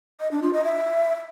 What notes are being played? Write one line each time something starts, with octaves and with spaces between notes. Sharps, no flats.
D#5
D4
F4
D#5
E5